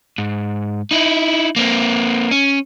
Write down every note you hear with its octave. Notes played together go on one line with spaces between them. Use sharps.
G#2
D#4 E4
A#3 C4
C#4